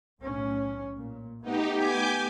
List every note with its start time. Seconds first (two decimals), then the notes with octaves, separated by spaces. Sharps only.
0.21 B1 A2 C#4
0.98 A#2
1.43 A3 B3 D#4 G4
1.75 G4 G#5 D6 G6